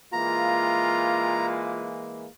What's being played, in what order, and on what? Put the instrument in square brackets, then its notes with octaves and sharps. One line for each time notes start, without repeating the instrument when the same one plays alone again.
[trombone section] E3 G#3 A#3 [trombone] F4 [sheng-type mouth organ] A#5